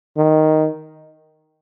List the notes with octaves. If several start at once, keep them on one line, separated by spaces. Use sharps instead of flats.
D#3